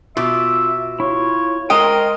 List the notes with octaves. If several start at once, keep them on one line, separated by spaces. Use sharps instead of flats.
B2 F4 E5 D6
E4 F4 C#5
G#3 A#4 C5 D#5 G5